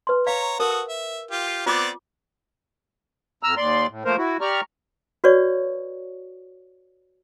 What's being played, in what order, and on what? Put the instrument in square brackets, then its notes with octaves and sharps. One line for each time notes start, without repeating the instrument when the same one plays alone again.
[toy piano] B4 C6
[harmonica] C#5 A#5 [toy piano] F5
[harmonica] F#4 A4 D#6 [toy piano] A#4
[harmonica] E5
F4 G4
[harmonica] B3 C4 D5 [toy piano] F4 D6
[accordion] F2 A#5 E6 F6
D#2 D5 C6
A2
F3 A3 A#3 A#4 C5
E4 F#4
G4 D5 A#5 C#6 F6
[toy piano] F#4 B4 C#5 D5 C#6